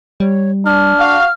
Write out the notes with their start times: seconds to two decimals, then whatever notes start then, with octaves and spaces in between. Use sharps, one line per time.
0.20 G3 C#5
0.66 D4 F6
1.00 F#4 F5